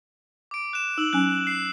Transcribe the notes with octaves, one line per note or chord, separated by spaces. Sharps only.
D6 D7
F#6 E7
D#4 E6 F#7
F#3 C#4 G#5 F#6
C7